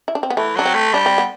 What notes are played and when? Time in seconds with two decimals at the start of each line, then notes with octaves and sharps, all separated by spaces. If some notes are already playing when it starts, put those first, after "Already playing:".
0.08 E4
0.15 D4
0.23 C4
0.30 B3
0.37 E3 A3
0.56 F#3 D4
0.66 C4
0.74 A3
0.93 G3 D4
1.06 C4
1.18 B3